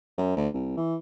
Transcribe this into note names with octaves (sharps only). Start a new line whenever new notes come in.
F#2
D2
C2
E3